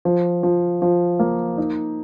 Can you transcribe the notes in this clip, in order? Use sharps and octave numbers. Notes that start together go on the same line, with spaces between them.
F3
F3
F3
A#3
D#4